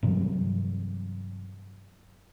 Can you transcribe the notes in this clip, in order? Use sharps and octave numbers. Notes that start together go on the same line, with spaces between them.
G2 C3 E3 F#3